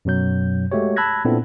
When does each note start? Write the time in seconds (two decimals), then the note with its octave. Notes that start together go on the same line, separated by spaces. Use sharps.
0.05 F#2 B2 F#3 G6
0.72 G#3 A3 F#4 G4 C#5
0.96 A5 B5 E6 F#6 G#6 A#6
1.25 A#2 B3 C4 D4 E4 A4